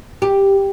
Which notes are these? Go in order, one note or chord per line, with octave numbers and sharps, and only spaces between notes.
G4